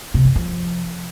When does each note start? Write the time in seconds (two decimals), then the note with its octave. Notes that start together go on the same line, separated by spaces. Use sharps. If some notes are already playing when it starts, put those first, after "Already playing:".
0.14 C3
0.25 F#2
0.36 F3